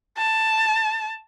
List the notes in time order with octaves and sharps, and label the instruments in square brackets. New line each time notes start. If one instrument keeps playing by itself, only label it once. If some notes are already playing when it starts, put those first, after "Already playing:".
[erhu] A5